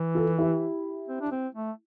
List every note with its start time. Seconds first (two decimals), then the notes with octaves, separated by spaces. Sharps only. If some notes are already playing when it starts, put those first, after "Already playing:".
Already playing: E3
0.15 F4 A4
0.39 E4 G4
1.08 C4
1.21 D4
1.32 C4
1.55 A3